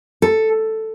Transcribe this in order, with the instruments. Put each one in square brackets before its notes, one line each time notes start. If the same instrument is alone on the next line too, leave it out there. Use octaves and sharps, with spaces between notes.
[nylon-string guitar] A4